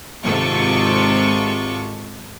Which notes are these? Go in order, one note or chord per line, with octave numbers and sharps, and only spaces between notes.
G#1 G#2 C3 F4 A4 C#6